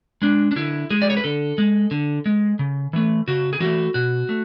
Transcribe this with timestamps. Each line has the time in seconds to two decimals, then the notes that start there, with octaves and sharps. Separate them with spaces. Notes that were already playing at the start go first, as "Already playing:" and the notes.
0.22 G#3 D4
0.51 D4
0.56 D3 E4
0.90 G#3 G#4
1.02 D5
1.10 C#5
1.17 B4
1.24 D3 A4
1.58 G#3
1.91 D3
2.26 G#3
2.59 C#3
2.93 E3 A3
3.28 C#3 F#4
3.53 G#4
3.60 E3 A3 F#4
3.94 B2 F#4
4.29 A3